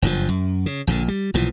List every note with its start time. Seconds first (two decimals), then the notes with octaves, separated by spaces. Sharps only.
0.02 F#1 G2 C#3 F3
0.29 F#2
0.66 C#3
0.87 A#1 A#2 D3
1.08 G3
1.34 B1 A#2 E3 F3